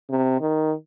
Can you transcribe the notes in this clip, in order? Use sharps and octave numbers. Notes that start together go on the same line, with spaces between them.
C3
D#3